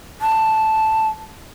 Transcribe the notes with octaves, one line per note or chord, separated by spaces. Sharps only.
A5